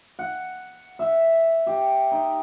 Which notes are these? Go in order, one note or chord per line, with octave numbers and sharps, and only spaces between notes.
F#5
E5
G4
D#4